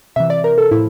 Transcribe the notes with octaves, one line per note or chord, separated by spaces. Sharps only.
C3 E3 E5
D5
A#4
A4
A2 F3 E4